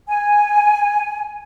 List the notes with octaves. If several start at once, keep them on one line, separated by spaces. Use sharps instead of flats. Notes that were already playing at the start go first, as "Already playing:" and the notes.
G#5